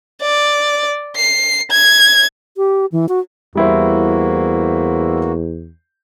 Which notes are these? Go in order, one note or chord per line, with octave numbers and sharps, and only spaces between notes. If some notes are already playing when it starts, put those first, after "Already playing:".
D5
C7
G#6
G4
E3
F#4
E2 G3 A#3 E4 F#4 C5